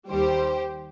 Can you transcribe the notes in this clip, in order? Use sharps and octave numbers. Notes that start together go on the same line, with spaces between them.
D#2 D#3 G3 G4 C5